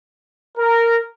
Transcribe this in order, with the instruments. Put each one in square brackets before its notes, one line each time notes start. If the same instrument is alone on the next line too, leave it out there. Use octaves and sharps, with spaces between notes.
[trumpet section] A#4